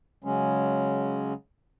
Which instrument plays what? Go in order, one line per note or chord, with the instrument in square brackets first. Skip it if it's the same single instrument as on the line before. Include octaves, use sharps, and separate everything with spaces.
[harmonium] C#3 F#3 G#3 C#4